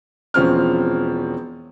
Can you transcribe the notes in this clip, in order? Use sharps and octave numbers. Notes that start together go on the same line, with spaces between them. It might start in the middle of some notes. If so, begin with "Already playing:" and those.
E1 F3 C4 C#4 F6